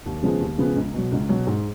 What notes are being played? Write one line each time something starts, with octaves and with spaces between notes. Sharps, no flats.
D#2
C#3 F3 G#3 B3
D#2
C#3 F3 G#3 B3
C#2
B2 F#3
C#2
B2 F#3
G#2